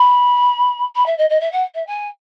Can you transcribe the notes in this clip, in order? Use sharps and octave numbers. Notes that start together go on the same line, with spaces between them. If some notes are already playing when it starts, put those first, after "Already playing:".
Already playing: B5
B5
E5
D#5
D#5
E5
F#5
E5
G#5